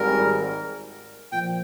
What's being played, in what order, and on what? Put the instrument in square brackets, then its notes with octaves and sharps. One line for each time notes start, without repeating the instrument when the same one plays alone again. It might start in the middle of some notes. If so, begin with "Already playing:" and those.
Already playing: [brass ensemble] G#1 G#2 G3 [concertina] A#4
[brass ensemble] A#2 F3 [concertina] G5